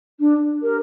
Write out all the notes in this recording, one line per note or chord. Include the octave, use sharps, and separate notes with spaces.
D4
G4 A#4